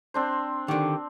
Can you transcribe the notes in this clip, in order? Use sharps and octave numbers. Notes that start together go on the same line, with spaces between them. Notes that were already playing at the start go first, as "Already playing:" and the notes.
C4 D4 C5
D3 D#3 G4